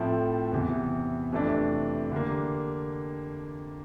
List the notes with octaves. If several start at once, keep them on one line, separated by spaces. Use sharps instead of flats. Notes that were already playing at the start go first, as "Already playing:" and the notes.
Already playing: A2 F3 C4 E4 A4
E2 C3 E3
F2 C3 E3 A3 D4
D3 G3 A#3